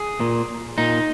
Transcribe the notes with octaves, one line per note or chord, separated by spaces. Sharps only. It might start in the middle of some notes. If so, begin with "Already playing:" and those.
Already playing: G#4
A#2
A#2 D#4